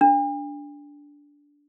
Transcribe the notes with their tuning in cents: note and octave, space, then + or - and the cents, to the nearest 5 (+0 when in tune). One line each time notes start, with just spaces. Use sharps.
D4 -15